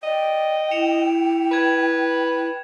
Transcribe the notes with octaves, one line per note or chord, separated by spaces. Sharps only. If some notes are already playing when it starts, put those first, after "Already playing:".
D5 D#5 G5
E4 C#7 E7 F7
B4 G#6 E7